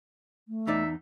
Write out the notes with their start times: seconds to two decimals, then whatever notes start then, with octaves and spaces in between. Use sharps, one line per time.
0.48 A3
0.67 E2 D#4 D5 E5